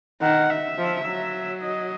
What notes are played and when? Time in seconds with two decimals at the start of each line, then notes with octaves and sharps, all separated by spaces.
0.21 D#3 F#5
0.50 E5
0.78 F3
1.06 F#3
1.63 D#5